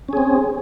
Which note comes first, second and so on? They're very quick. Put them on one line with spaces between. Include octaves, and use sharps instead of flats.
C#4 G#4 C4